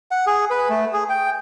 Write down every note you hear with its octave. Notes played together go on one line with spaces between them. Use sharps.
F#5
G#4
B4
A3
G#4
G5